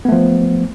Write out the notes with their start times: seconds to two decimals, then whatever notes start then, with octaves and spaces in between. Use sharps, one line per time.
0.05 B3
0.09 A3
0.12 F3